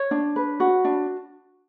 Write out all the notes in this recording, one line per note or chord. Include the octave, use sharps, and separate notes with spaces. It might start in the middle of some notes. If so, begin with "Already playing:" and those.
Already playing: C#5
D4
B4
F#4
D4